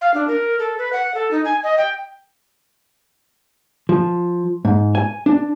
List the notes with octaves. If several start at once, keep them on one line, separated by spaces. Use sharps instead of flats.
F5
D4
A#4
A4
B4
F#5
A4
D#4
G#5
D#5
G5
F3
G#2
G#5
D4